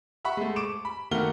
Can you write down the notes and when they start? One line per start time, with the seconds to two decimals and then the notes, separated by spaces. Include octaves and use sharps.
0.25 E5 F#5 B5 C#6
0.37 G#3 A3
0.56 C#6 D6 D7 E7
0.85 B5
1.11 D#3 A3 A#3 F#4 F6 G7